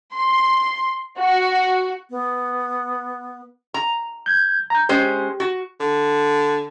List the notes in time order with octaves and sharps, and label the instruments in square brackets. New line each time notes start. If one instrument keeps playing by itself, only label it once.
[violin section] C6
F#4
[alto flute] B3
[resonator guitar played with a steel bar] A#5
[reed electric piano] G6 G#6
A#5 G6
[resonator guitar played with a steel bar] G#3 C#4 C5 [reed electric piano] G4
[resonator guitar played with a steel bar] F#4
[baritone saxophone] D3